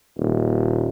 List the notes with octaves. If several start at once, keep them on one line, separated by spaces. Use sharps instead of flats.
D#1